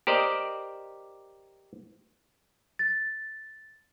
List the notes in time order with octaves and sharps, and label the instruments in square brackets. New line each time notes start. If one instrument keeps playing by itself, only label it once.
[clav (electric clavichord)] G4 A#4 C5 D5 D#5
[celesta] A6